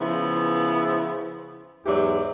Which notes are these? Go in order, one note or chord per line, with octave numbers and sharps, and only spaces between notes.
C#3 F3 B3 E4
E2 G#2 E3 F#3 G4 D5